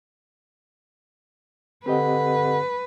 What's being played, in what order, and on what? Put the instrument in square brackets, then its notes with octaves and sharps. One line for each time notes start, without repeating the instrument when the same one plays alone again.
[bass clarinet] D3 [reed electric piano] C4 G4 D#5 [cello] B4